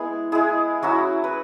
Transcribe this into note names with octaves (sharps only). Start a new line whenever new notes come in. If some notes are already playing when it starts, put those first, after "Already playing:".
Already playing: G#3 B3 E4 G#4
G#3 E4 G#4
F#3 C#4 E4 F#4
B4